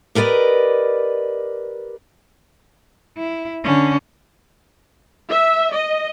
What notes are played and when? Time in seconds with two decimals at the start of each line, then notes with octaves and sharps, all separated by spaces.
0.15 G4 A#4 B4 D5 D#5
3.17 E4
3.64 D3 C#4
5.30 E5
5.71 D#5